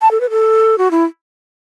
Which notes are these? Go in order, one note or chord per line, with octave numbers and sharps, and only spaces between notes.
A5
A4
B4
A4
F#4
E4